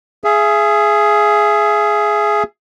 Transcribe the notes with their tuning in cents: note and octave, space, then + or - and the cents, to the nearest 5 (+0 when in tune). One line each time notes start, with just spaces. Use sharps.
G#4 +10 E5 +40